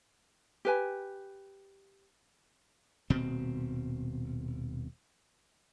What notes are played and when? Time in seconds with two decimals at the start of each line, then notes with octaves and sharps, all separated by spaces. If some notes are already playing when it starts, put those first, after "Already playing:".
0.65 G4 B4 G#5
3.10 D#1 B2 C4